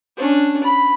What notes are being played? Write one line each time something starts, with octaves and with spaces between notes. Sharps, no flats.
C#4 D4
B5